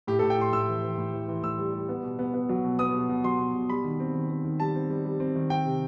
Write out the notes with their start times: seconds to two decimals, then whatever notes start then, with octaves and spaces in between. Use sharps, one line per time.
0.07 A2 G4
0.19 A4
0.22 A2
0.30 G5
0.38 A2 C6
0.52 A2 E6
0.68 E3
0.83 E3
0.98 A2
1.13 E3
1.28 E3
1.43 A2 E6
1.59 G3
1.73 G3
1.89 B3
2.03 B2
2.19 B3
2.34 B3
2.49 F#3
2.64 B2
2.79 B3 D#6
2.94 B2
3.09 B2
3.24 F#3 C6
3.39 B2
3.55 B2
3.70 G3 B5
3.84 D#3
4.00 C4
4.15 D#3
4.30 C4
4.44 D#3
4.60 G3 A5
4.75 C4
4.90 G3
5.05 G3
5.20 C4
5.35 D#3
5.50 C4 G5
5.65 C3